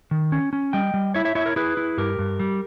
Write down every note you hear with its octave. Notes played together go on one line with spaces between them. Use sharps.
D#3
C#4
C#4
G3 D#5 G5
G3
E4 C#5 E5
C#5 E5
E4 C#5 E5
A#4 C#5
E4 G#4 B4
E4
G2 G4 A#4
G2
G3